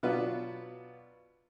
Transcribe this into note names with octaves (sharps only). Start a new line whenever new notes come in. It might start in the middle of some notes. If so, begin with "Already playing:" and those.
B2 F#3 B3 D4 F4 B4